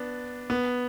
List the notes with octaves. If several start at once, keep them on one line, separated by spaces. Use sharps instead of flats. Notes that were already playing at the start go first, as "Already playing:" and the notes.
Already playing: B3 D4
B3